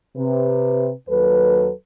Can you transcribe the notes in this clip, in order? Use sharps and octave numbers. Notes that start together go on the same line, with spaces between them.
C3 B4
D#2 F#3 A4 B4